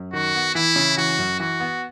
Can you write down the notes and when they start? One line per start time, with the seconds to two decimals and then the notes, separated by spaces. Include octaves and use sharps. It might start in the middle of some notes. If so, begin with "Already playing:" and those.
Already playing: F#2
0.13 D#3 F#4
0.34 B3
0.55 E3 E4
0.76 C#3
0.97 E3 F#4
1.19 F#2
1.39 E3 F#4
1.60 B3